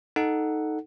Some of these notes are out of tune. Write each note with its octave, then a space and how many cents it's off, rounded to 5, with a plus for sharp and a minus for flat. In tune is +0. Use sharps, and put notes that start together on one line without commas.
D#4 +0 A4 +0 F#5 +0